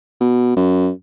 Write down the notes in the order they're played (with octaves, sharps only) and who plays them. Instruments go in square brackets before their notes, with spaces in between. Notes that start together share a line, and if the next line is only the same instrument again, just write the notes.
[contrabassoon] B2
F#2